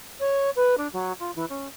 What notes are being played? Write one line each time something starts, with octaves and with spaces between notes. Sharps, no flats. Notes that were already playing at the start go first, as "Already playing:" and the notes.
C#5
B4
D4
F#3
F4
E3
C#4